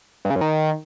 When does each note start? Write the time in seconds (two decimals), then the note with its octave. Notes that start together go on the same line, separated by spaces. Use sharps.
0.25 G2
0.30 C#3
0.36 F#2
0.41 D#3